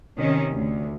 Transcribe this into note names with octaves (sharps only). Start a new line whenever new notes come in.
C3 D#3 C#4
D2